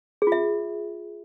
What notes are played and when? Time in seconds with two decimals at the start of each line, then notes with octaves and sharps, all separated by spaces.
0.22 G#4
0.27 F4
0.32 E5